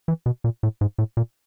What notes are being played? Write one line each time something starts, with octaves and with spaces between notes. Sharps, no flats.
E3
B2
A#2
A2
G#2
A2
A#2